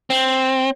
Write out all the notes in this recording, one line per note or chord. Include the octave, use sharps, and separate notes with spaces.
C4